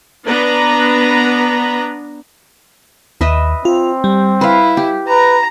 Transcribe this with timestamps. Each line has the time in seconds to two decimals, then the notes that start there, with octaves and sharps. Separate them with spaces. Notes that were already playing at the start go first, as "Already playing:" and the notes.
0.24 B3 D4 B4 A#5
3.21 D#2 B4 D#5 E5
3.65 C4 F4
4.04 G3
4.41 E4 B4 F5
4.77 G4
5.08 B4 A#5